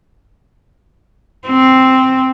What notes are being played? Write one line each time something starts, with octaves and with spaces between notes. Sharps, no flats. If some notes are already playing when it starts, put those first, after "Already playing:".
C4